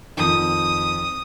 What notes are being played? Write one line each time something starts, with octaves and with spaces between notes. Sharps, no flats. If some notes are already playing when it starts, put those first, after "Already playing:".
F2 D#3 D#6